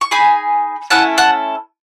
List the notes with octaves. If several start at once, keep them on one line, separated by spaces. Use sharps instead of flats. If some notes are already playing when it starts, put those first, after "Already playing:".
C#6
D#4 G#4 G#5 B5
A3 C#4 E4 A4 F#5 A5
F#5 A5